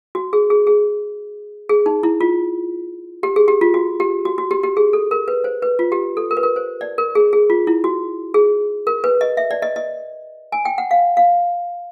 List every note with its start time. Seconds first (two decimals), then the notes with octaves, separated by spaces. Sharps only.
0.15 F#4
0.33 G#4
0.50 G#4
0.67 G#4
1.69 G#4
1.86 D#4
2.03 E4
2.21 F4
3.23 G4
3.36 G#4
3.48 G4
3.61 F4
3.74 F#4
4.00 G4
4.25 F#4
4.38 F#4
4.51 G4
4.63 G4
4.77 G#4
4.93 A4
5.11 A#4
5.28 B4
5.44 C5
5.62 B4
5.79 F4
5.92 G4
6.17 A4
6.31 A#4
6.37 B4
6.43 A#4
6.56 C5
6.81 D5
6.98 A#4
7.15 G#4
7.33 G#4
7.50 F4
7.67 E4
7.84 F#4
8.34 G#4
8.87 A#4
9.04 B4
9.21 D#5
9.37 E5
9.51 D5
9.62 D#5
9.76 D#5
10.52 G#5
10.65 G5
10.78 F#5
10.91 F5
11.17 F5